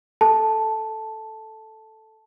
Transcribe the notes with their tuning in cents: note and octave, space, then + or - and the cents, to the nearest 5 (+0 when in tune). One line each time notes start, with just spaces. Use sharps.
A4 +0 A5 -5